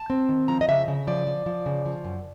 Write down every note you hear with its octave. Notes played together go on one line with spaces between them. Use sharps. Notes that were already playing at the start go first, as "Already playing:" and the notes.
Already playing: A5
C4
D#3
F3 A#5
D#5
C#3 E5
C#3
F3 D5
F3
F3
C#3
F3
F#2